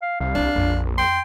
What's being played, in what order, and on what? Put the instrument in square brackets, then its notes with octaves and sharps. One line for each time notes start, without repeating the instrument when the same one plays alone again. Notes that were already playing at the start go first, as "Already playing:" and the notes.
[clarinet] F5
[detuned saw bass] C2 [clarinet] F5
[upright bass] C3 G3 [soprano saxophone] D4
[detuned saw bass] A#1 [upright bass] F2
[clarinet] G5 [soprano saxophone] C6